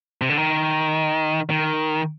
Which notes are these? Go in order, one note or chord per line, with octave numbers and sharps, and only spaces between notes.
C3
D3
D#3
D#3